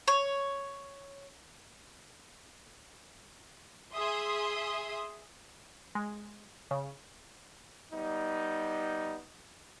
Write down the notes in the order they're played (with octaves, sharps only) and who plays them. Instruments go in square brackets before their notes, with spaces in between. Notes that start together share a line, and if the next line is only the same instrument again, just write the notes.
[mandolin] C#5
[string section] G#4 E5 C6 D#6
[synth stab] G#3
C#3
[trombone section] G3 B3 D#4